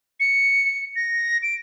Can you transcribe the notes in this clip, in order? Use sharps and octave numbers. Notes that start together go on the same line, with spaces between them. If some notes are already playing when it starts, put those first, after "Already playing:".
C#7
A#6
D7